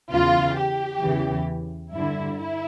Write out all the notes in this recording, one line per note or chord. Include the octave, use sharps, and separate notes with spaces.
E2 C#3 E3 F4
G4
E2 C#3 E3
G2 D3 E4
E4